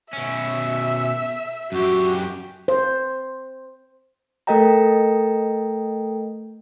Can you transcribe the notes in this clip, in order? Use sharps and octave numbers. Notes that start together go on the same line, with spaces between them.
B2 C#4 E5
F#2 F#4 G4
C5
A3 A4 A#4 D#5 G5 A#5